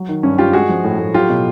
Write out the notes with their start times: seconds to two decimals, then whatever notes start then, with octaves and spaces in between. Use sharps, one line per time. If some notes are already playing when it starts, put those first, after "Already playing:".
Already playing: F#3
0.09 D#3
0.23 G2 C#4
0.38 G2 F4 G4
0.53 G#3 F#4 G#4
0.69 F3
0.84 A2
1.00 A2
1.14 F#3 F4 G4
1.30 B2